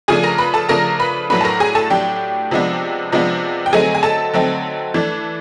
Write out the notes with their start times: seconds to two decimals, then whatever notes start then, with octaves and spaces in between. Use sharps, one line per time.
0.08 C#3 F3 A3 D4 G#4 G#5
0.23 A#4 A#5
0.38 B4 B5
0.54 A4 A5
0.69 C#3 F3 A3 D4 A#4 A#5
1.00 B4 B5
1.30 A2 F#3 A3 D4 B4 B5
1.41 A5
1.45 A#4 A#5
1.60 G#4 G#5
1.75 A4 A5
1.90 A2 F#3 A3 D4 G4 G5
2.51 C3 F3 G#3 B3 D4
3.12 C3 F3 G#3 B3 D4
3.66 G5
3.73 D3 F#3 A3 C4 D#4 G#4 G#5
3.95 G#5
4.03 A4 A5
4.34 D3 F#3 A3 C4 D#4
4.94 E3 A3 D4